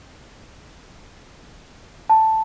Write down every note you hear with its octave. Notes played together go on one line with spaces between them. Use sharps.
A5